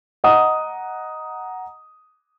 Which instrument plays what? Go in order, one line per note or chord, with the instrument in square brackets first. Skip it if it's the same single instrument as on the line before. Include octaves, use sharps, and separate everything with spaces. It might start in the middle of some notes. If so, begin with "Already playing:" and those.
[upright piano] D#5 F#5 A#5 D#6